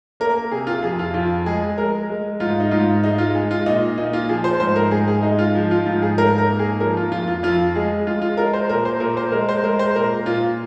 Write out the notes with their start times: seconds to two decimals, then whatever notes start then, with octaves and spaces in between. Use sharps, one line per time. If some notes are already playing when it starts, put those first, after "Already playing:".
0.20 A#3 A#4
0.51 C3 G#4
0.67 F4
0.83 F2 G#4
0.99 F4
1.14 F2 F4
1.46 G#3 G#4
1.78 G#3 A#4
2.09 G#3
2.40 G#2 F4
2.60 D#4
2.71 G#2 F4
3.04 G#3 D#4
3.18 F4
3.35 G#3 G#4
3.51 F4
3.66 A#2 D#4
3.98 A#2 D#4
4.13 F4
4.29 F3 G#4
4.44 C5
4.60 G#2 C5
4.76 A#4
4.91 G#2 G#4
5.08 G#4
5.23 G#3 D#4
5.39 F4
5.55 F3
5.71 F4
5.86 G#2 F4
6.02 G#4
6.18 G#2 A#4
6.38 A#4
6.49 A#3
6.59 G#4
6.80 F3 A#4
6.97 F4
7.12 F2 F4
7.28 F4
7.43 F2 F4
7.76 G#3 G#4
8.06 G#3 F4
8.22 F4
8.37 G#3 A#4
8.53 C5
8.69 A#2 A#4
8.85 C5
9.00 A#2 A#4
9.17 C5
9.32 G#3 A#4
9.49 C5
9.64 G#3 A#4
9.79 C5
9.96 A#2 A#4
10.26 A#2 F4